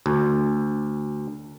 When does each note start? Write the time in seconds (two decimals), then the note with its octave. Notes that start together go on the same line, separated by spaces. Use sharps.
0.06 D2